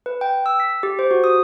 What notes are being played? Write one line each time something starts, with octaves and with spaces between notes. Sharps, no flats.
B4
G5
E6
B6
G4
C5
F#4
D#6